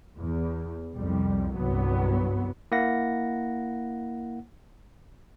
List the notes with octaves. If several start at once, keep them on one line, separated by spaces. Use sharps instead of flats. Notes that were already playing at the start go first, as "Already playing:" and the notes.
E2
C2 F2 G3
G1 C2 G2 F#3 B3
A#3 E4 F#5 A#6